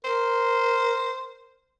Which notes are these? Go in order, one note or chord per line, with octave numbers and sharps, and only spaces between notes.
A#4 C5